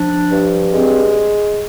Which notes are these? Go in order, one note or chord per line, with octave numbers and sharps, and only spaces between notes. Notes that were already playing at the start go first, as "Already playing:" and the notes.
Already playing: F3 D4
G2
G#3 C4